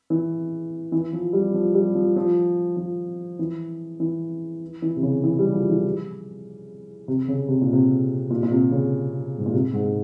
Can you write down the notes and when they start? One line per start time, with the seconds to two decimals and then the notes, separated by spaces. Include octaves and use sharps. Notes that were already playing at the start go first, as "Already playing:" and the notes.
0.10 E3
0.92 E3
1.13 F3
1.33 G3
1.54 F3
1.74 G3
1.95 F3
2.16 F3
2.77 F3
3.39 E3
4.00 E3
4.82 E3
4.96 C3
5.03 C#3
5.23 E3
5.39 G3
5.53 F3
5.70 E3
7.08 C3
7.28 C#3
7.48 C3
7.61 A#2
7.73 C3
8.31 A#2
8.43 A#2
8.51 C3
8.72 C#3
9.38 G#2
9.46 A#2
9.53 C3
9.73 G#2